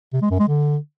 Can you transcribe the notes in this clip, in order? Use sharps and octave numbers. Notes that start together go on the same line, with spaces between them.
C3
G#3
F#2
G#3
D3